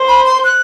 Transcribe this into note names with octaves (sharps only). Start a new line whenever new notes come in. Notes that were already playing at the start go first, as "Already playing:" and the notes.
Already playing: C5
B5
C6
F#6